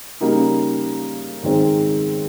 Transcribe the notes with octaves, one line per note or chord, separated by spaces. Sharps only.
C#3 G3 A#3 D#4
G#2 D#3 G#3 C4